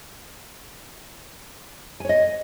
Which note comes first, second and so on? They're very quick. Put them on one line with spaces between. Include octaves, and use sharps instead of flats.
G#5 C#5 D#5